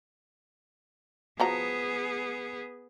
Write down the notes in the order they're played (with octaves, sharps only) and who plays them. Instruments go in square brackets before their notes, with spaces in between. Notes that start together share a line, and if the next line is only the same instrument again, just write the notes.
[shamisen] F3 F#4 A#5 [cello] B3 G#4